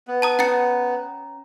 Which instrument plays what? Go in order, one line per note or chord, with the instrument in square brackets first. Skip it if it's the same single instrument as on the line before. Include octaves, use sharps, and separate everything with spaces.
[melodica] B3
[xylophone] A5 A#5 D#6
[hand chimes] C#4 A#5 [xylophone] F#5 A6 C#7